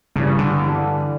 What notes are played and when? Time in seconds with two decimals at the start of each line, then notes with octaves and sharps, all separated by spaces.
0.16 G2 C#3 E3 G3
0.39 D3
0.62 G2 E3 G3